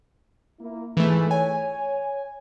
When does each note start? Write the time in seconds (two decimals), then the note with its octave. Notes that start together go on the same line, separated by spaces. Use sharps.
0.60 A#3 E4
0.97 G#2 E3 A3 G#4
1.31 C#5 G#5